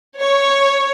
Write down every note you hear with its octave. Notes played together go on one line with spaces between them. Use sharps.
C#5